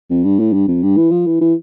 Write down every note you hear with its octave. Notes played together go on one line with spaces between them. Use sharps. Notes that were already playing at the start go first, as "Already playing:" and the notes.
F2
G2
A2
G2
F2
G2
E3
F3
E3
E3